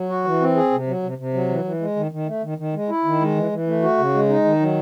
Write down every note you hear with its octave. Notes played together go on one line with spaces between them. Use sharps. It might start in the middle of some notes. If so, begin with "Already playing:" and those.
Already playing: F#3
F#4
E3
C4
G#4
C3
F#3
C3
C3
F#3
E3
E3
G#3
D#3
D#3
A3
D#3
D#3
G#3
E4
D#3
G#3
E3
E3
A3
F#4
C#3
G#3
D#4
D#3
F#3